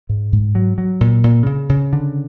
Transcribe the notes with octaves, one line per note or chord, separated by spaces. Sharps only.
G#2
G#2
F#3
F#3
A#2
A#2
C#3
C#3
D3